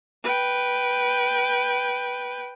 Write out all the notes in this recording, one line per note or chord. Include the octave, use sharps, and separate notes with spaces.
B4 G5